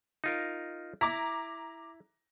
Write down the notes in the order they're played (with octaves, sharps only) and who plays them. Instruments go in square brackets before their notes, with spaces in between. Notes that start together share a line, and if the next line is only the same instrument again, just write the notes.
[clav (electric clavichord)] D#4 F4 A#4
[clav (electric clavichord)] E4 [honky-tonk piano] A#5 D6